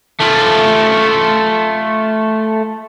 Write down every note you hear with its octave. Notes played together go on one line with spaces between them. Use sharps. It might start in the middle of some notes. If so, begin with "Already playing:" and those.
A3 F4